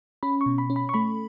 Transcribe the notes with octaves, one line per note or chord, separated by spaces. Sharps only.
C#4 B5
C#6
B2
B5
C#4
B5
C#6
A3 B5